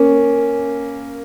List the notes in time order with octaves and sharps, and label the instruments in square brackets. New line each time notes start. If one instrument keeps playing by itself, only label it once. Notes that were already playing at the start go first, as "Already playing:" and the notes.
Already playing: [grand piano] A#3 C#4